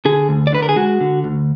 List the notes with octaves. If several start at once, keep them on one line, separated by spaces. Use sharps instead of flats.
D3 G#4
D2
D5
D3 B4
A#4
G#4
G#3 F#4
D3
D2